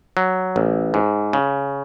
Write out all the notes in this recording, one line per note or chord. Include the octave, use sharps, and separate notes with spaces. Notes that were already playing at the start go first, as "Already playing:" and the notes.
F#3
A1
G#2
C#3